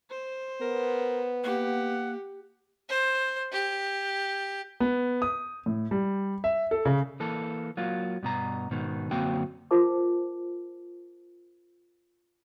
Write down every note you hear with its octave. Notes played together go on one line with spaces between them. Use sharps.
C5
B3 A#4
A#3 G4 F#5
C5
G4
B3
D#6
A2
G3
E5
A4
C#3
E3 A#3 A4
F#3 A#3 F4
G2 B2 A#5
G#2 B2 D#3
F#2 D3 A#3 C4 F#4 G5
F4 A#4 C5 A5 D6